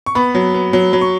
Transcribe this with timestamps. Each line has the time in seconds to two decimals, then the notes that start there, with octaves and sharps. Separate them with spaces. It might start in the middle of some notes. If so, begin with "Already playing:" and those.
0.06 C#6
0.15 B3 B5
0.35 F#3
0.54 B3
0.73 F#3
0.93 F#3 B5
1.01 C#6